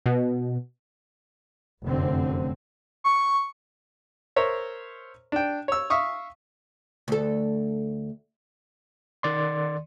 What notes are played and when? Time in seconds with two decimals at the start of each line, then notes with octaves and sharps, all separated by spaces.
0.06 B2
1.85 F1 F#2 D3 C4
3.04 C#6
4.36 A#4 C5 C#5 E5
5.32 D4 G5
5.68 C#5 E6
5.90 E5 F5 C#6 D#6
7.08 D2 A4
9.23 D#3 D5 C6